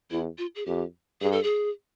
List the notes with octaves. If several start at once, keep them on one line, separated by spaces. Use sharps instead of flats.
E2 E4
F4
G#4
F2 G4
G2 G#4
A4
G#4